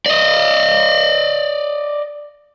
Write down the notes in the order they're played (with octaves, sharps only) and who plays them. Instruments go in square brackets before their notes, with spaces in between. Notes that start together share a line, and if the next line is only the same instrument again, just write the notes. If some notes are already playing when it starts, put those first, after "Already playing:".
[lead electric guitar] D5 D#5